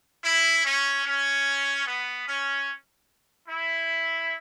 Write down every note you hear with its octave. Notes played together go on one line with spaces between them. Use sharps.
E4
C#4
C#4
B3
C#4
E4